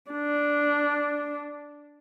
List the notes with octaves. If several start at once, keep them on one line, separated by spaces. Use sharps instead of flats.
D4